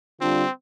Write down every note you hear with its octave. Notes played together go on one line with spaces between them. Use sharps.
D3 G3 C4 D4 F4